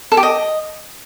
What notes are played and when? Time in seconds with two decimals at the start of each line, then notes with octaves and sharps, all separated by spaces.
0.12 A4
0.17 G4
0.23 D#5